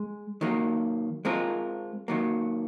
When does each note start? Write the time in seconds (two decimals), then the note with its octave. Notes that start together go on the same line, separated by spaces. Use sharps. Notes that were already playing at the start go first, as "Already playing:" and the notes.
Already playing: G#3
0.41 D#3 F#3 A#3
1.25 G#3 C4 F4 A#4
2.08 D#3 F#3 A#3